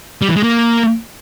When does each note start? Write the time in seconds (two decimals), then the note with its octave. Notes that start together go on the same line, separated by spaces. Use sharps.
0.22 G3
0.29 E3
0.36 G#3
0.43 A#3